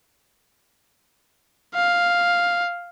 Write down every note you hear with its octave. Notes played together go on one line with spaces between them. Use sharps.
F5